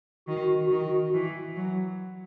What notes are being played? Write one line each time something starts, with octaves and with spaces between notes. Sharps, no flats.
D#3 F#4
D#3 F#4
E3
F#3